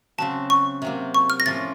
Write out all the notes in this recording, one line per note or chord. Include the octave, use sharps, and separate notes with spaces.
C#3 F#3 C4 F#4 A5
C#6
C3 F#3 A#3
C#6
F6
A#6
A2 F3 A#3 C#4 F4 A6